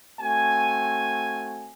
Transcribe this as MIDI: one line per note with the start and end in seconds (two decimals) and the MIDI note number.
0.20 1.73 57
0.20 1.73 60
0.20 1.73 66
0.20 1.73 80